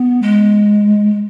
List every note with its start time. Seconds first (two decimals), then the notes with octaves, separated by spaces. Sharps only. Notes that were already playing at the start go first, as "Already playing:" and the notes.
Already playing: B3
0.22 G#3